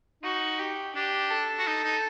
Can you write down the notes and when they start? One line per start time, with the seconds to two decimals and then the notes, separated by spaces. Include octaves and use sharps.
0.23 D#4 F#4
0.59 G4
0.95 D4 G4
1.31 A4
1.59 F#4
1.67 D#4
1.84 D#4